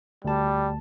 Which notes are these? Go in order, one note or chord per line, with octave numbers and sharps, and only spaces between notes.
D2 G3 A5